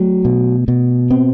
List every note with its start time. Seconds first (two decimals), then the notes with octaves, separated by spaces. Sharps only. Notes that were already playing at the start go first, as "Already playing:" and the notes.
Already playing: F#3 A3
0.25 B2
0.68 B2
1.11 B3 C4